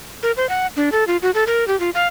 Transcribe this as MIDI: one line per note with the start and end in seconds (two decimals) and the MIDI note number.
0.23 0.32 70
0.37 0.48 72
0.49 0.67 78
0.76 0.89 62
0.92 1.04 69
1.07 1.17 65
1.22 1.31 66
1.34 1.47 69
1.47 1.67 70
1.68 1.78 67
1.80 1.90 65
1.95 2.07 77